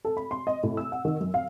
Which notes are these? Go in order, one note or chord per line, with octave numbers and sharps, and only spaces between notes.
A4
B5
C6
D#5
A2
E6
F#5
D#3
F#2
F5